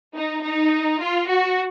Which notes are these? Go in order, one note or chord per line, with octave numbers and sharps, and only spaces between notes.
D#4
D#4
F4
F#4